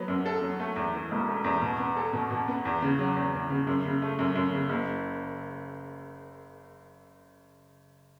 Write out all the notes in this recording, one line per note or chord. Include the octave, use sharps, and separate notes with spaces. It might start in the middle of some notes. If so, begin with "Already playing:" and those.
Already playing: F#3 B3
F#2
A4
F#3
A3
E2
E3
E1
A3
E2
B2
B3
A4
B2
B2
B3
E2
C#3
F#3
E2
E2
C#3
F#2
C#3
A3
F#2
F#2
C#3
F#1